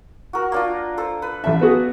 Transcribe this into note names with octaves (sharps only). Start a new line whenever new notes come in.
F#4 A#4
A#3 D4 F4
A4 C5
B4
A1 E5 A5
B3 F#4 G#4